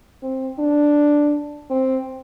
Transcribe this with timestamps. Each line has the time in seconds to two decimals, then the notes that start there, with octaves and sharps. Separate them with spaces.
0.23 C4
0.59 D4
1.70 C4